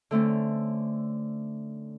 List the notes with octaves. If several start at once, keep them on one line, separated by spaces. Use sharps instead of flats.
D3 A3 C4 C#4